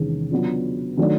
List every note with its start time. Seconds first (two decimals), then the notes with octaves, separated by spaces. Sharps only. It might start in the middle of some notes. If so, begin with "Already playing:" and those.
Already playing: E2 C3 D#3 G#3 C#4
0.31 C#3 F#3 B3 D4 F4
0.97 D#3 F#3 A3 D4